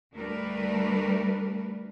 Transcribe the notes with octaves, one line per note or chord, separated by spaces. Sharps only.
D2 G3 A3 D4 A#4 B4